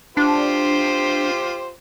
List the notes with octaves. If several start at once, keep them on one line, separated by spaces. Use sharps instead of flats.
D4 F4 G4 C5